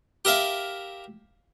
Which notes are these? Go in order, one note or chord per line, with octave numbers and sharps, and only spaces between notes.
G4 A#4 E5 F5